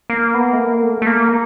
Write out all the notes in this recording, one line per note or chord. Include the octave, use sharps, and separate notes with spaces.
A#3
B3
A3
A#3
A3
A3
A#3